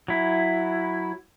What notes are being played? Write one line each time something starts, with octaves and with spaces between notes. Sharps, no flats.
F#3 E4